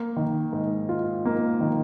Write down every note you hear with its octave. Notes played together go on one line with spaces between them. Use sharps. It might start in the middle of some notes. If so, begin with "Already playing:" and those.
Already playing: A#3
D#3
G#2
F4
A#3
D#3